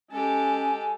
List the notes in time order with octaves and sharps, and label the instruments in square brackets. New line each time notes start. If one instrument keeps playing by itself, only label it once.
[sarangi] G#3 [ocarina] C#4 [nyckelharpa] G4 A4 [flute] G#5